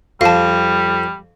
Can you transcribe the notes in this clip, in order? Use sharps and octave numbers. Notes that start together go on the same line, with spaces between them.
F2 G3 F5 A5